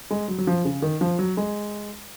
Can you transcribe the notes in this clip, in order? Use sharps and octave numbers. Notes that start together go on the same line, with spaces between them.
G#3
F#3
F#3
F3
C#3
D#3
F3
F#3
G#3